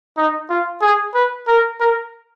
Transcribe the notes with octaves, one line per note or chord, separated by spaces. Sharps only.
D#4
F4
G#4
B4
A#4
A#4